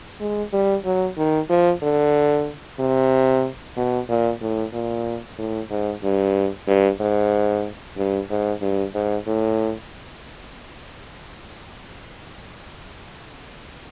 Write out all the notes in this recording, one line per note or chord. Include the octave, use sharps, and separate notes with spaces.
G#3
G3
F#3
D#3
F3
D3
C3
B2
A#2
A2
A#2
A2
G#2
G2
G2
G#2
G2
G#2
G2
G#2
A2